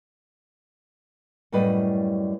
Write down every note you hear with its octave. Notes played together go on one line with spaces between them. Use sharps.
F#2 A2 G3 B4 D5 D#5